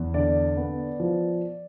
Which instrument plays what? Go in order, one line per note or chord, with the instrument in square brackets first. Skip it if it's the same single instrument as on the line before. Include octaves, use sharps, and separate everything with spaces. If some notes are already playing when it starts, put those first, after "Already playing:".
Already playing: [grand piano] E2
D3 D5
B3
F3